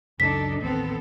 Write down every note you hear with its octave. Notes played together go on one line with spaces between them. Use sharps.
F#1 C#2 F#2 D4 D#4 A4 B6
A1 D#2 B3 C4 A4